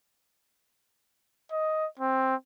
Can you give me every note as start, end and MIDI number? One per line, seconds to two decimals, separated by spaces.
1.52 1.86 75
1.99 2.35 60